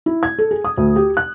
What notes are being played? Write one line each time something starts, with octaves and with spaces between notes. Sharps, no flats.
E4
G#6
A4
G#4
D#6
D2
G4
F#6